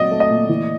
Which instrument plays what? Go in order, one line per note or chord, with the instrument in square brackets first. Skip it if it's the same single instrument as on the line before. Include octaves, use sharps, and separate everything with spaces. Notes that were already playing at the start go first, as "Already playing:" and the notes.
Already playing: [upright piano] A#2 F#3 A3 C4 [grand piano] D5 D#5
[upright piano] A3
[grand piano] D#5
[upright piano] A#2
E3